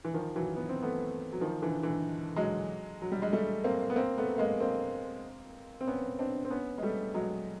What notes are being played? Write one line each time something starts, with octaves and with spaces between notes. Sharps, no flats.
E3
D#3 F3
E3 F#3
B3
C4
A3 B3
F#3
D#3 F3
D3 E3
D3 E3
F#3 G#3
F#3
G3
G#3
G3 A3
A#3 C4
B3
A#3 C4
A3 B3
G#3 A#3
A#3 C4
C4
B3 C#4
C4 D4
C4
B3 C#4
G#3
G3 A3
F#3 G#3